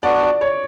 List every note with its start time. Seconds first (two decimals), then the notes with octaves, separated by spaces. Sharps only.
0.03 B3 D4 F#4 D5
0.23 D5
0.41 C#5